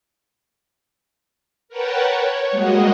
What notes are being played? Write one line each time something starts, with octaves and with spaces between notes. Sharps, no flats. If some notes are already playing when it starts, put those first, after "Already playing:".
A#4 B4 C#5 F#5 G5 A5
C#5
G3 G#3 A#3 F#4 D#5 F#5